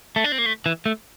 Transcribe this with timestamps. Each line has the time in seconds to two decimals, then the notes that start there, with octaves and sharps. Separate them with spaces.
0.16 A3
0.24 D4
0.32 C4
0.38 A#3
0.46 A3
0.66 E3
0.86 A3